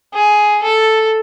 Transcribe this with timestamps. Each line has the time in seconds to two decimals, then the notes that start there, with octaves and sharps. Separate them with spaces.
0.14 G#4
0.63 A4